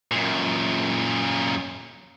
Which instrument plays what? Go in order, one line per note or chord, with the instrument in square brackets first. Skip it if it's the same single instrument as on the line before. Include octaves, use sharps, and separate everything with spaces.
[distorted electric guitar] F#2 A#2